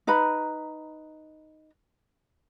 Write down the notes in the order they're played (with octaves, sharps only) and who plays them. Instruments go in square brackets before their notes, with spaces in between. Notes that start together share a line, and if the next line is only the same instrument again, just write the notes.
[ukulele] D#4 B4 A#5 B5